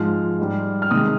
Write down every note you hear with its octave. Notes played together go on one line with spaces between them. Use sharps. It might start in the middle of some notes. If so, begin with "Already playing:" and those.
Already playing: G#2 F3 G#3 F6
G#2 G3
F6
C3 D#3 G#3 D#6